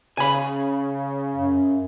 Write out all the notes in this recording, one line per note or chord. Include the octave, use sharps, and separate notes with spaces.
C#3 G#5 B5
F#2